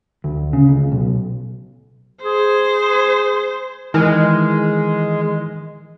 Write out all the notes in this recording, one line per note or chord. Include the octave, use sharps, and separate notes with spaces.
D2
C#3
C#2
B1
G#4 C5
D#3 E3 G#3 F6